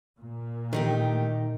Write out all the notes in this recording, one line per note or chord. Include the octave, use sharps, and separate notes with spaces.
A#2
D#3 A3 D#4 G4